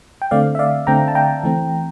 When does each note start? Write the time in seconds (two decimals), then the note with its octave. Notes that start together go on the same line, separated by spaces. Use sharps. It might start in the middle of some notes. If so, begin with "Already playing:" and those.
0.22 G5
0.31 D3 A3 C4 D5 F5
0.55 E5
0.59 D5 F5
0.87 D3 A3 C4 G5 A#5
1.08 A5
1.15 G5 A#5
1.44 E3 A3 C4